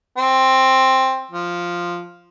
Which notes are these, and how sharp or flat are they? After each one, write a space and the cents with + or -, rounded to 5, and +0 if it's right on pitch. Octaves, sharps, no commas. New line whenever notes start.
C4 +10
F3 +0